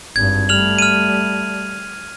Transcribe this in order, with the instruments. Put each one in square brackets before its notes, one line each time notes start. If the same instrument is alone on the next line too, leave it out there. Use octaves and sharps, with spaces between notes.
[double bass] G#1 G2 [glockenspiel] G#6
[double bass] G3 A3 [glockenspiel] F6 F7 F#7
[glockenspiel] F6 D#7